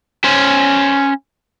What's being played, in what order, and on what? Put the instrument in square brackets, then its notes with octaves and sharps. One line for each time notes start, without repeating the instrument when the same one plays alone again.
[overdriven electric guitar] C#4 C5